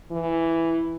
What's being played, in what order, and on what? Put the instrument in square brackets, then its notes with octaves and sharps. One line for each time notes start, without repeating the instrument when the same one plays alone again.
[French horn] E3